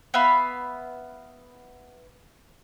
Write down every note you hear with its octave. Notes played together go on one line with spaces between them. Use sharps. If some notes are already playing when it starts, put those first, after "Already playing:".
B3 E5 F5 B5